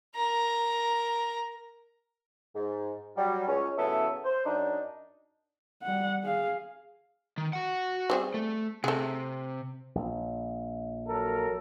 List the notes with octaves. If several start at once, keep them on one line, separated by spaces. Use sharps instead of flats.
A#4 A#5
G#2
F#3 G3
C#2 C#4
A2 C#3 F#3 B3 A4 E5
C5
F#2 D4 D#4
G3 F#5
G#4 F5
D#3
F#4 F#5
G3 C4 G#4
A3
C3 A3 G#4
A#1
F#3 A4 A#4